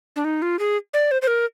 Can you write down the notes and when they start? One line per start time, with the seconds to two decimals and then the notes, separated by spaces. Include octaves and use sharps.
0.16 D4
0.25 D#4
0.42 F4
0.59 G#4
0.94 D5
1.11 C5
1.22 C5
1.27 A#4